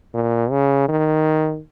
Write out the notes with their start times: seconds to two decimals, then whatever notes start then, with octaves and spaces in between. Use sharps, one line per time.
0.14 A#2
0.51 C#3
0.88 D#3